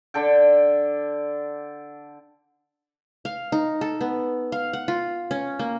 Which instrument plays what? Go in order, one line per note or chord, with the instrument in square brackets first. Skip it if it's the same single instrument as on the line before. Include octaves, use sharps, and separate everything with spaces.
[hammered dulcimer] D3 A4 G5
[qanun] F5
D#4
A4
B3
F5
F#5
F4
C#4
A#3